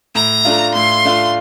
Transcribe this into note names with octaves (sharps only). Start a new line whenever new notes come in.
A2 A#5
A3 D4 F4
A2 C6
A3 D4 F4